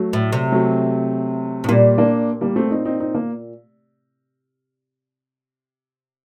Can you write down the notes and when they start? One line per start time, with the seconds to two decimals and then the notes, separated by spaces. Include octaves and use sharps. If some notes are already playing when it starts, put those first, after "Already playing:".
Already playing: F#3 A3
0.13 A2
0.33 C3
0.52 F#3 A3
1.64 A2
1.68 A#2 G3 A#3
1.98 A#3 D4
2.41 G3 A#3
2.56 A3 C4
2.71 C4 D#4
2.85 C4 D#4
3.00 C4 D#4
3.14 A#3